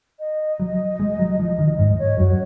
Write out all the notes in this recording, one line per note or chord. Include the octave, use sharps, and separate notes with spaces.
D#5
F#3
G#3
F#3
F3
D#3
G#2 D#5
C#5
F#2 F#4